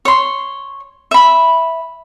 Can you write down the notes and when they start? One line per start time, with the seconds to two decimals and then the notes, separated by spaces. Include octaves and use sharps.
0.05 C#5 C6
1.11 E5 B5